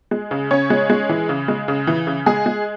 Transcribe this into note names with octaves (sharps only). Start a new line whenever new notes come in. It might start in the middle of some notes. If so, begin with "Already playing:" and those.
G#3
C#3
C#3 C#4 C#5
G#3
G#3
E3
C#3
G#3
C#3
E3
C#3
G#3 G#4
G#3